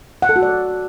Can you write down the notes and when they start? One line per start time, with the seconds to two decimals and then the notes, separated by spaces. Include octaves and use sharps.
0.22 F#5
0.29 A4
0.36 F#4
0.42 D5